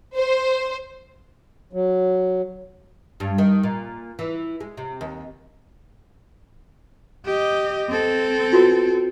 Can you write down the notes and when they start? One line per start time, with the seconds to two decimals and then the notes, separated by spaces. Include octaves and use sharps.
0.16 C5
1.73 F#3
3.20 G2
3.38 D#3
3.63 A#2
4.19 E3
4.60 G#3
4.77 C3
5.01 D#2
7.25 G4 D#5
7.89 C4 A4
8.53 F4 F#4 B4